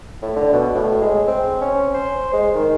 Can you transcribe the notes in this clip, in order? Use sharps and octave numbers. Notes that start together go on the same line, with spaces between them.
A2
D3
B2
A2
G#3
C4
C#4
C5
G#3
D#3